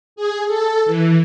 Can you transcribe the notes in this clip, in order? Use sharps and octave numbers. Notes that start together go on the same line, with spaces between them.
G#4
A4
E3